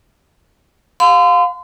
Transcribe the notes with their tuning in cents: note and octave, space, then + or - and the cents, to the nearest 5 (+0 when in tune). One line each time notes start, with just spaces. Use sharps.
F5 +25 C6 -35